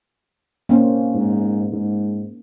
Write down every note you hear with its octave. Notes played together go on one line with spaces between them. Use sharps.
A#3 C4 C#4
G#2
G#2